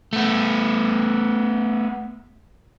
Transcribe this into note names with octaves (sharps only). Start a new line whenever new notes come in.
A3 B3